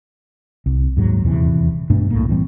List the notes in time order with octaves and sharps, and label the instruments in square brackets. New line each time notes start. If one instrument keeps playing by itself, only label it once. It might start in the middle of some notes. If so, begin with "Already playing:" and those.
[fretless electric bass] C2
D#2 G#2 F#3
D#1 E2 C3 E3
G2 B2 A3 D4
C2 A2 A#3
A2 E3 G3 C4